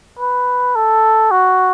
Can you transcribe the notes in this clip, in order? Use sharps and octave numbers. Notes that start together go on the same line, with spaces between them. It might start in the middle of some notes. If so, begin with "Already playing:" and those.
B4
A4
F#4